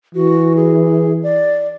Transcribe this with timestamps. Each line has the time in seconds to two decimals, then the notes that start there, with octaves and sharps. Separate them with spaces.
0.15 E3 F#4
0.56 G#4
1.23 D5